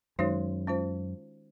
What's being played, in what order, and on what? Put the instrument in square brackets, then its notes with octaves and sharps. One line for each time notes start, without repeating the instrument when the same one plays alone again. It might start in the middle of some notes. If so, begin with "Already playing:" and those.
[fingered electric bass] F#2 [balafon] D#3 G#3 D#4 F#4 C#5
[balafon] G#3 C#4 F4 C5